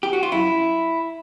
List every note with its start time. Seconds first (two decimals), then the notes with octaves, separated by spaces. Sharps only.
0.03 G4
0.13 F#4
0.23 F4
0.32 F#2 E4